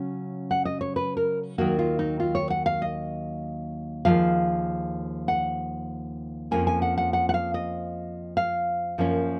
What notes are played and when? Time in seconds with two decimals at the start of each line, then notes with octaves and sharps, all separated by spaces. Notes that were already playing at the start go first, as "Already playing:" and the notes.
Already playing: C#3 F#3 C#4
0.51 F#5
0.65 D#5
0.81 C#5
0.96 B4
1.17 A#4
1.58 D#2 D#3 F#3 A#3 F#4
1.79 F4
1.99 D#4
2.20 F4
2.35 C#5
2.50 F#5
2.66 F5
2.82 D#5
4.05 D#2 C#3 F3 G#3 F5
5.28 F#5
6.51 F2 F3 A#3 C#4 G#5
6.67 G#5
6.82 F#5
6.98 F#5
7.13 F#5
7.29 F#5
7.34 F5
7.54 D#5
8.37 F5
8.98 F#2 F3 A#3 C#4